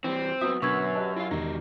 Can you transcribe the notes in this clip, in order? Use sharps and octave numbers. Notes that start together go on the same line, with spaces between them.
E3 G3 C4
F#2 B3 F#4 B4 E5 D#6
F#2 B2 D3 B4 C#6 E6 G#6
G4 D#5 A5
E4 F4 F5
E1 D#3 F#4 G4 D#5 A#5